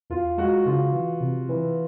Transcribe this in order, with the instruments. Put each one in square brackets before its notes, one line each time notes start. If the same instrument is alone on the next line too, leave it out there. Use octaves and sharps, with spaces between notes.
[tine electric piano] E2 [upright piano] F4
[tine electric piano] G#3 [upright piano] F#4
[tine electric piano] C#3 [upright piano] F4
[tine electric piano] E3
C3
E3